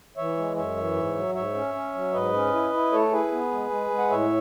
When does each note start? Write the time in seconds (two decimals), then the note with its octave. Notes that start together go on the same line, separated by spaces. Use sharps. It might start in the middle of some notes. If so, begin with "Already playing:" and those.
0.17 E3 C#5 E5
0.37 G#3
0.56 F#2 C#5 E5
0.76 E3
0.96 G#2
1.15 F#3
1.35 G#2 C#5 E5
1.55 C#4
1.74 C#4
1.94 F#3
2.13 G#2 B4 D#5
2.34 C#4
2.52 E4
2.73 E4
2.92 A3 A4 C#5
3.12 E4 G#4 B4
3.31 B3
3.51 G#3
3.70 G#3
3.90 G#3
3.98 F#5
4.10 A2 C#5 E5